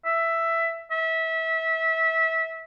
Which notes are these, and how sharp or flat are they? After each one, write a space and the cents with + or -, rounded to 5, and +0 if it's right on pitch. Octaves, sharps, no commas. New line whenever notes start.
E5 +10
E5 -25